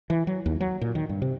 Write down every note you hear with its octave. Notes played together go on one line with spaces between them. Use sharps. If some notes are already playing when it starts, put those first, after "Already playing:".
E3
F#3
D#2
F#3
A#2
D#3
G2
C3